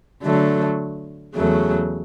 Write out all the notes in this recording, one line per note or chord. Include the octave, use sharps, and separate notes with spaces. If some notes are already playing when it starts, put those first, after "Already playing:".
D3 F#3 A3
E2 C#3 F#3 A3